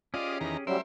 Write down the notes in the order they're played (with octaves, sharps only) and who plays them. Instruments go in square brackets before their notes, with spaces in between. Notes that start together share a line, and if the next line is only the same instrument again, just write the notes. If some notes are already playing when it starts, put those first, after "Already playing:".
[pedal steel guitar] C#4 G4 G#4 [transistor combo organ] F4 D5 D#5
[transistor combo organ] E2 D#3 A#5
[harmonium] F#3 G3 C#4 [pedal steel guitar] A3 A#4 [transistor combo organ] C5 E5